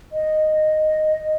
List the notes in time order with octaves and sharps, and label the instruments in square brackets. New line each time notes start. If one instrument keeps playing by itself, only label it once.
[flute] D#5